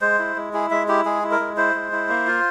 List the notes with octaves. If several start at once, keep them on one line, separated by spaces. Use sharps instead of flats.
G#3 C5
E4
G#3
E4 G#4
G#3 E5
E4 G4
G#3 G#4
E4
A#4
G#3
E4 C5
G#3
E4
A#3
F4